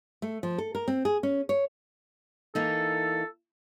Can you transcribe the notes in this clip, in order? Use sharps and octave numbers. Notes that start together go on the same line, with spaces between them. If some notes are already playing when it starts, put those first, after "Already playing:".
A3
F3
A4
A#4
C4
G#4
C#4
C#5
E3 A#3 D#4 A4